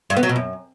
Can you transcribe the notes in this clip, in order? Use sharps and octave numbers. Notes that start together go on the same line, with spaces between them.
G2
B3
F#3
B2
F#2